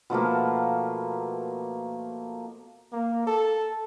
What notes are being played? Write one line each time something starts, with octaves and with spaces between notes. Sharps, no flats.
B2 F3 A3 A#3
A#3
A4